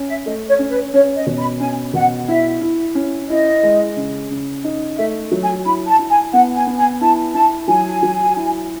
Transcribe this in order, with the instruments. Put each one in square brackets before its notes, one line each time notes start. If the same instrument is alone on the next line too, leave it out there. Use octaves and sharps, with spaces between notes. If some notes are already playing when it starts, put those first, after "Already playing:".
Already playing: [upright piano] C#4
[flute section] E5
[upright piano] A3 [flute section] D#5
[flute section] C#5
[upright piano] C#4
[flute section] B4
[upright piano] C#4 [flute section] C#5
[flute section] D#5
[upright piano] B2
[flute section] B5
[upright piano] C#4 [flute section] G#5
[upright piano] B2 [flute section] F#5
[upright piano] E4 [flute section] E5
[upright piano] E4
C#4
[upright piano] E4 [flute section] D#5
[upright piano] G#3
C#3
C#3
D#4
[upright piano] A3 [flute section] E5
[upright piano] F#3
[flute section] G#5
[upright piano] E4 [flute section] B5
[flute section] A5
[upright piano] E4
[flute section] G#5
[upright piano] B3 [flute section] F#5
[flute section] G#5
[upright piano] B3
[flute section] G#5
[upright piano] E4 [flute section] A5
[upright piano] E4 [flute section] A5
[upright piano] F#3 [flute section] G#5
[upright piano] F#3
E4